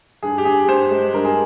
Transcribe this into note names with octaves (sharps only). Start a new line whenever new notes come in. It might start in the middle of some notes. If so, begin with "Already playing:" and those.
G2 G#4
G4
G2 G#4
G2 C5
G#3
G2 A#4
G#4